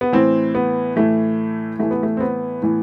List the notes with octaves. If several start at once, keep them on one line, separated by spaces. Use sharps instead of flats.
B3
A2 E3 C4
B3
A2 E3 A3
A2 E3 A3
B3
A3
C4
B3
A2 E3